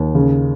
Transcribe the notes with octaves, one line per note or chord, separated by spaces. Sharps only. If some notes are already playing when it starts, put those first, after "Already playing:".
Already playing: D#2
C#3